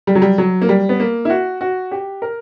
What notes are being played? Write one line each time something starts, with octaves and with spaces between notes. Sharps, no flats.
G3
F#3
G3
F#3
A#3
G3
B3
A#3
E4
F#4
F#4
G4
A#4